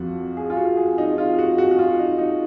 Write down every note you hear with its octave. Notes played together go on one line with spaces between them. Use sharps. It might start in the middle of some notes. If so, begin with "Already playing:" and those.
Already playing: F2 F3 F#4
G#4
F4
F#4
G#4
D#4
F4
F#4
F#4
F#4
F4
D#4
D#4